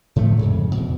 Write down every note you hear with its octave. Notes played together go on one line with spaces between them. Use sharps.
A2 D3 F3 A3
F2 G#2 C#3
E2 B2